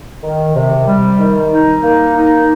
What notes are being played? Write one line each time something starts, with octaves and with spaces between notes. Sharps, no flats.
D#3
C3
G3
D#3
D#4
A#3
D#4